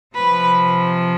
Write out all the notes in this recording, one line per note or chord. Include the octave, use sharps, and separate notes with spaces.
C3 F3 B4